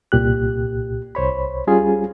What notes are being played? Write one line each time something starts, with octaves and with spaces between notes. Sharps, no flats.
C2 A#2 G4 F#6
C2 C5 C#5 B5
G3 C#4 F4 G#4 G#5